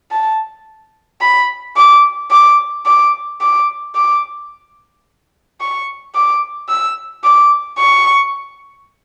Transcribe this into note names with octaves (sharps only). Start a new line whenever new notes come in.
A5
B5
D6
D6
D6
D6
D6
C#6
D6
E6
D6
C#6